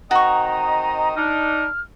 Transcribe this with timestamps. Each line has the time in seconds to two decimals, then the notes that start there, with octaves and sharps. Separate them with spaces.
0.11 D#3 C4 F#4 D#5 A#5 C#6
1.16 D4 D#4 F6